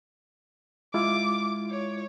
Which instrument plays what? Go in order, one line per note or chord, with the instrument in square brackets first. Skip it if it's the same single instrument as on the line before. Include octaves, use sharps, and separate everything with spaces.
[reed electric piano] G#3 E4 F4 [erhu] D6
[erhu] C#5